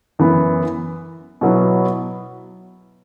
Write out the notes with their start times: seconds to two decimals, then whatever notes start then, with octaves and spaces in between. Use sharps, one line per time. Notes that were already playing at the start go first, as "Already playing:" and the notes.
0.19 F#2 E3 B3 E4
1.41 B2 F#3 B3 E4